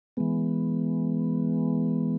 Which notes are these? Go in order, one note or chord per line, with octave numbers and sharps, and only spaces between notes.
E3 G#3 B3